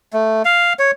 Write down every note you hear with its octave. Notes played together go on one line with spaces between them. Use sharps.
A3
F5
C#5